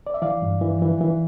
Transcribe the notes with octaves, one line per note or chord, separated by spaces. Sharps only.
D5
E5
E3 D5 F5
G2
E3
E3
E3